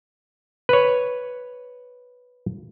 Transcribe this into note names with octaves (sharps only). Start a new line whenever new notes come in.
B4 C#5